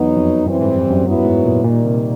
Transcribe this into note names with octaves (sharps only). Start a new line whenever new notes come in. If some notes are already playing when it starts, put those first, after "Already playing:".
Already playing: E2 F#3 B3 D#4
F2
F#2 E3 G3 C4
G#2
F2
F#2
G2 F#3 B3 E4
G#2
A#2
A#2 D#3 G3 A#3
C3